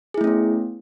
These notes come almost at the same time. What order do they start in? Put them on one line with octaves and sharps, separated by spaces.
G#4 E4 A3 C#4 B3